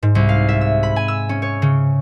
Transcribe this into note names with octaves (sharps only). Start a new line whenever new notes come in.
G#2
C2
F5
E5
E6
B5
G#5
E6
C#4
C#5
C#3